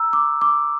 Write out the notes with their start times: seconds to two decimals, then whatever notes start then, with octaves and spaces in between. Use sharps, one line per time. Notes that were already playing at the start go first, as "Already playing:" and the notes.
Already playing: A#5 E6
0.13 D6
0.41 D6